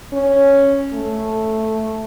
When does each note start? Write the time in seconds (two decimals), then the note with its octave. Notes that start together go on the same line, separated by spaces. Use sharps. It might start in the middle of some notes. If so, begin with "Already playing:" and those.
0.13 C#4
0.94 A3